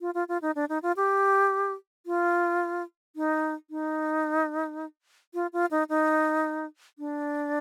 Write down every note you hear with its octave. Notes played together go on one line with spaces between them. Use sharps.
F4
F4
F4
D#4
D4
D#4
F4
G4
F4
D#4
D#4
F4
F4
D#4
D#4
D4